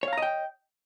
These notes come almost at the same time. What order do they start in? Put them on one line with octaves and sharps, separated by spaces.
C#5 F5 A#5 D#5 G5